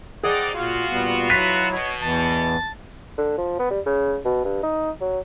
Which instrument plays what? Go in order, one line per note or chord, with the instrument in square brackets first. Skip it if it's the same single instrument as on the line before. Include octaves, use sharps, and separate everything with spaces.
[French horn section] C4 D#4 D5 [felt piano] G#4 [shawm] F#5
[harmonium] A#2 [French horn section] F4 F#4 [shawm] F5
[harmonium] A#2 G3 B3
[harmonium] F#3 E4 [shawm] B4 [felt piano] B6 D#7
[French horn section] B2 [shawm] C#5
[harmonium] E2 E3 [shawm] A5
[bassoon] D3
F3
B3
G3
C#3
B2
G2
D#4
F#3